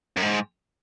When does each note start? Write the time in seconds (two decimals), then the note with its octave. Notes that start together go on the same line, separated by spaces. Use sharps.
0.17 F#2
0.22 G#2